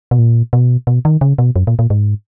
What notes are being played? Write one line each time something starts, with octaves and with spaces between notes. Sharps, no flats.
B2
A#2
B2
B2
D#3
C#3
B2
F#2
A#2
A#2
G#2